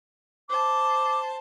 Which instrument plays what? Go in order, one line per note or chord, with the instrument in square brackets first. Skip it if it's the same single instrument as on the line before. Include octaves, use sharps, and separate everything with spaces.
[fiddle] C5 A5 [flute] D6